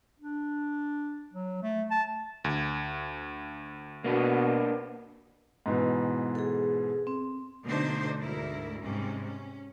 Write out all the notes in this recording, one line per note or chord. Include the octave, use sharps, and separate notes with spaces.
D4
F#3
A3
A5
D2
B2 A#3 D4 B4
G#2 B2 E3
G#4 A4
C4
B2 D3 A3 D4 D#4 C5
D2 G#2 E4 A#4
G#2 C3 G3 C#4
C#4